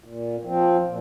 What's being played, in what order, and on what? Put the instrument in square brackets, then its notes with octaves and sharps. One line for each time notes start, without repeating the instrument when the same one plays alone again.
[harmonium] A#2
F3 C4
A#2